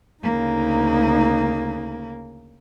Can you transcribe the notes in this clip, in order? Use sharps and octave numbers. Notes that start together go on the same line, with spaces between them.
D2 C#3 A#3 D#4